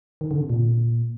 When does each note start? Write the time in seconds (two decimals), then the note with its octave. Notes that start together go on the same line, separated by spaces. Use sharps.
0.21 D#3
0.31 D3
0.41 C3
0.50 A#2